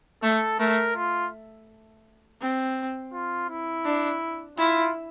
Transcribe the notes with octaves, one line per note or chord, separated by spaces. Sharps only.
A3 A4
A3 A#4
F4
C4
F4
E4
D4
E4 F4